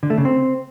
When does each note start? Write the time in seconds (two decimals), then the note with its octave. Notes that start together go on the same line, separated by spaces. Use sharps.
0.03 D3
0.10 A3
0.18 C#3
0.25 C4